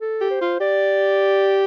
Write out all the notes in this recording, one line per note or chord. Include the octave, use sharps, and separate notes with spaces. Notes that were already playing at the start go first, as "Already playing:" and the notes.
A4
G4
C5
F4
G4 D5